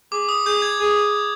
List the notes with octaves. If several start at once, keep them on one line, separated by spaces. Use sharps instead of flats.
G#4 D6
D#6
G#4 G6
G#6
G#4